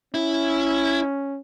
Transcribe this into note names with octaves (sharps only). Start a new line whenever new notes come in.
C#4 E4